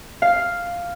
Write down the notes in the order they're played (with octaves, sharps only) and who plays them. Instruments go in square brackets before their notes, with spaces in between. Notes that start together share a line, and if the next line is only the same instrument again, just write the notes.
[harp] F5